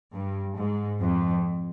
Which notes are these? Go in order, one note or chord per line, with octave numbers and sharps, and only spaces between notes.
G2
G#2
F2